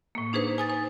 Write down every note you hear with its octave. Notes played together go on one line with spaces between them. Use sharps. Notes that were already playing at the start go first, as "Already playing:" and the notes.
A2 A#3
D4 D#4 G#4 B4 C5
G#5 D#6 A6
C5